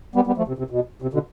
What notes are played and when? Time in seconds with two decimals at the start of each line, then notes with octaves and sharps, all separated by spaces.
0.15 G3 B3
0.27 G3 B3
0.37 F3 A3
0.48 C3
0.58 C3
0.70 B2
1.02 C3
1.13 B2 D3